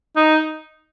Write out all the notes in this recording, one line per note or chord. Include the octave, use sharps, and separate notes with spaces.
D#4